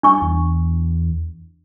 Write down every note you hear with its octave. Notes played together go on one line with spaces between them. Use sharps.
G2 D4 C#6
E2